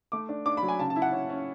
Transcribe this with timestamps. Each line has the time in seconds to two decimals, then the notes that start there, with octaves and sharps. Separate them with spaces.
0.12 A3 D6
0.29 D4
0.46 D4 D6
0.57 B5
0.63 F#3
0.68 G#5
0.79 C#3 A5
0.90 A5
0.96 E4
1.02 F#5
1.12 C#4
1.30 C#4